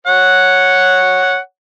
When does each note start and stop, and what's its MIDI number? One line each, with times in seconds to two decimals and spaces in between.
0.07 1.37 73
0.07 1.37 78